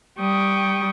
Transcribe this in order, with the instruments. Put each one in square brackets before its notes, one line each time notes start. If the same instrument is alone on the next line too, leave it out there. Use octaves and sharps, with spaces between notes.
[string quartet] G3 G5 C#6 D#6